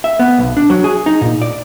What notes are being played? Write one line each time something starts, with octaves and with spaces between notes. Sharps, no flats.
E5
B3
B1
D4
F#3
G#4
D#4
A#2
D5